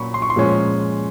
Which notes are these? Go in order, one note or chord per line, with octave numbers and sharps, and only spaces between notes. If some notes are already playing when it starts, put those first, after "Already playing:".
Already playing: A#2 F#3 C#4 B5 C#6
C6
C#6
C6
A#2 F3 G#3 C#4